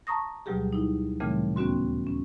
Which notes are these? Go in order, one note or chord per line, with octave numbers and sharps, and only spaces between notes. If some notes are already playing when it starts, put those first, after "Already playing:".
A5 A#5 C#6 D#6 A#6
D2 B2 F#3 G3 G4 G#4
D#4 E4
A#2 C#3 E3 G3 A3 C4
D#2 B3 C#4 F#4 C6
C#4